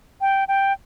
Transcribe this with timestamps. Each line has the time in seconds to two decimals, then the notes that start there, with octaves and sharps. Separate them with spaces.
0.21 G5
0.48 G5